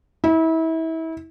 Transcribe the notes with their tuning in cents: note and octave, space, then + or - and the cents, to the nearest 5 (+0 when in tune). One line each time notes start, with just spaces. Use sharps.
E4 -30